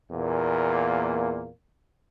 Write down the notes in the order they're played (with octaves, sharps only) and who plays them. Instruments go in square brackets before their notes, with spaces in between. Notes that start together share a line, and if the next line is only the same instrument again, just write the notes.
[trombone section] E2 A#2 A#3